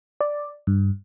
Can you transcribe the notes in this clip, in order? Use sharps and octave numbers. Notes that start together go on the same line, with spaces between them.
D5
G2